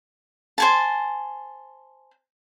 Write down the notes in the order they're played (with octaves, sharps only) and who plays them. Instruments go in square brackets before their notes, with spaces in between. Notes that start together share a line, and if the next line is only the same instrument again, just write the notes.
[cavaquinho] C5 G#5 A5